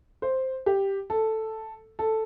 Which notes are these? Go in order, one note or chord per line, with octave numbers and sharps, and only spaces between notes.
C5
G4
A4
A4